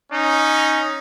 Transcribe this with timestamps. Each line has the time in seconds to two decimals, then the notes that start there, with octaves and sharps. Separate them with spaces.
0.12 C#4 D#4